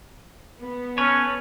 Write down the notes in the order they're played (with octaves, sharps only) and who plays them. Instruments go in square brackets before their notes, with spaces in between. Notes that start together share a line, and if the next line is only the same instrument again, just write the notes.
[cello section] B3
[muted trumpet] C#4 [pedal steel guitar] A4 B4 C#5